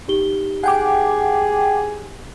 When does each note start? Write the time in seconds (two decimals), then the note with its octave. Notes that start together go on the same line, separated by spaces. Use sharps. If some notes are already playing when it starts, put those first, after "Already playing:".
0.08 D#4 G4 G7
0.63 G#4 F#5 G5 D6